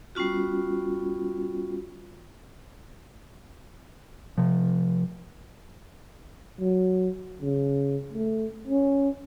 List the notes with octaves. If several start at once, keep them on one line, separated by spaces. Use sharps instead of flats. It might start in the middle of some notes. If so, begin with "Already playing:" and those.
G3 B3 C#4 F4 F#4
C3 F3
F#3
C#3
A3
C#4